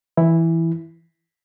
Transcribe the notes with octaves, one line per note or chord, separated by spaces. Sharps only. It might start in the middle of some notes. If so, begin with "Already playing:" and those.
E3 E4